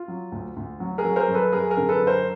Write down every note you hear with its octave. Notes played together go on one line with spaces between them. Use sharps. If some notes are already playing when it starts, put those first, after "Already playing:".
Already playing: F4
F#3
D2
D2
F#3
G#4 A#4
F#3
A#4 C5
F#2
A4 B4
F#2 G#4 A#4
G#4 A#4
D3
A4 B4
F#2
A#4 C5